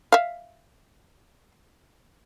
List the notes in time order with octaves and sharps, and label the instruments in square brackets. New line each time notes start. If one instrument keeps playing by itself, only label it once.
[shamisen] E5 F5